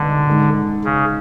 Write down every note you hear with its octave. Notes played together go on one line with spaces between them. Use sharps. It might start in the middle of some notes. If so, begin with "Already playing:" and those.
Already playing: C#2 B2 D3 G3 D#4
G#2 D#3 G#3
C#3